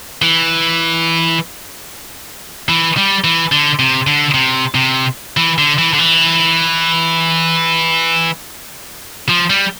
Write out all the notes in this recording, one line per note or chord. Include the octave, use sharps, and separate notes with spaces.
E3
E3
G3
E3
D3
C3
D3
C3
C3
E3
D3
E3
D3
E3
F3
G3